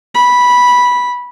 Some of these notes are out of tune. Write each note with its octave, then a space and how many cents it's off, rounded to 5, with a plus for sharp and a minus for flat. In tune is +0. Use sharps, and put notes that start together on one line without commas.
B5 -10